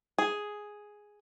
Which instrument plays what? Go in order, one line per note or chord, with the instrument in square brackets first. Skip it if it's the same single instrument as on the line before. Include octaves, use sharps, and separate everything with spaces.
[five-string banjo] G#4